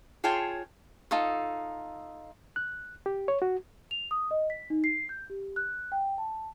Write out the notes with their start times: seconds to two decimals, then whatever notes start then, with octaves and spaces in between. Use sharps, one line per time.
0.24 F4 G#4 C#5 G5 A5
1.11 D#4 F4 A4
2.56 F#6
3.06 G4
3.28 C#5
3.42 F#4
3.91 F7
4.11 D#6
4.31 D#5
4.50 B6
4.70 D#4
4.84 C7
5.09 G6
5.30 G4
5.56 F#6
5.92 G5
6.18 A5